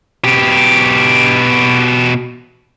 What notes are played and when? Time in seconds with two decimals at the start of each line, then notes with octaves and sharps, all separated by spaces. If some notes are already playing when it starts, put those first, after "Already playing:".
0.24 B2 G4